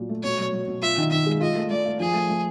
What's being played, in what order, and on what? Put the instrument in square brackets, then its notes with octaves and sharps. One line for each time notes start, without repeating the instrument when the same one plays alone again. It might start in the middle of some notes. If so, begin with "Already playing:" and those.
Already playing: [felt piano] A#2 F#3
A3
[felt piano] B2 [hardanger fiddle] C#5
[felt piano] F#3
F#3
B2
[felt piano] F4 [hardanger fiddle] E5
[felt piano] D#3
[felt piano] D#3 [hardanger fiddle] E5
[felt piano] G#3
[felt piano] F4 [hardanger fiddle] D#5
[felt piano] A3
[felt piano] A3 [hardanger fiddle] D5
[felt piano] A3
[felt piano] F3 [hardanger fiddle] G#4
[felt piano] A3
A3